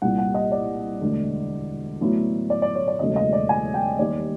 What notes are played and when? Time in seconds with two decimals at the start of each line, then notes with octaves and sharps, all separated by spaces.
0.02 C2 A#2 G3 F#5
0.18 F#5
0.35 D#5
0.52 D5
1.01 E1 D2 D3
2.01 A1 A2 F#3 B3 E4
2.50 D5
2.62 D5
2.75 C#5
2.88 D5
2.99 E1 D#2 C#3 F#3 A3 D#5
3.16 D#5
3.33 D5
3.49 G#5
3.74 G5
3.99 D#2 D#3 G3 D5